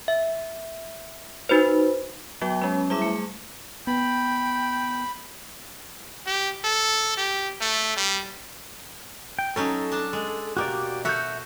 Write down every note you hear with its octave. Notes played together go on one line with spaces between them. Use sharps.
E5
D#4 F#4 B4 C5
F#3 B3 F#4 G5
F#3 G#3 C#4
G3 E4 G#4 E5 D6
A3
B3 G5 B5
G4
A4
G4
A3
G3
G5
F#3 C#4 D#4 A4
D4 A5
G#3
B2 A#3 F#4 G4 D5
F#4 A4 C#5 E5 G6